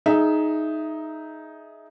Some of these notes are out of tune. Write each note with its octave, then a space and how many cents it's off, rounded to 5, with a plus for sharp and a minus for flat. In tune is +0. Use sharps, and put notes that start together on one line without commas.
D#4 +0 G#4 +20 E5 +0